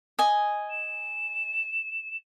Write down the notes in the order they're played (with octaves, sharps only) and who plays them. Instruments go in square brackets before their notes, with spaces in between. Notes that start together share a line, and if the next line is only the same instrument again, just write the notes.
[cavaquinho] D#5 G#5
[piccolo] E7